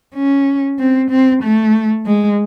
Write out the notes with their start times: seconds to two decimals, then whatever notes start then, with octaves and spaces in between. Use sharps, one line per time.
0.14 C#4
0.79 C4
1.10 C4
1.43 A3
2.06 G#3